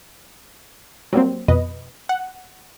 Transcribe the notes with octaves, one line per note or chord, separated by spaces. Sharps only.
F#3 G3 A#3 C4
F2 B2 B4 D#5
F#5